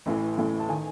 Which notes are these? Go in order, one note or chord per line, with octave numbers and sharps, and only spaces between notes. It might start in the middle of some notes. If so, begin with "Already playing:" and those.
A1 A2 E3
A1 A2 E3
A5
D#3 G#5